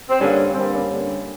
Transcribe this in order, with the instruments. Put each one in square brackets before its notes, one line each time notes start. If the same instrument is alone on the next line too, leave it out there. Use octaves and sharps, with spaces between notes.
[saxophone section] C4
G2 D3 G3 A#3 C#4
G2 D3 G3 A#3 C4
C#4
G2 D3 G3 A#3